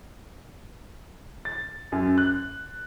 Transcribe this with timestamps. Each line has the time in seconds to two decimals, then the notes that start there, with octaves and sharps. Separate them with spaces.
1.45 A6
1.92 F#2
2.18 F#6